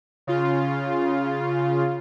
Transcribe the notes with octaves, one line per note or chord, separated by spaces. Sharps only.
C#3 F4